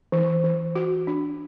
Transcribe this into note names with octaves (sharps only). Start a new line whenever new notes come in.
E3
E3
F#4
D4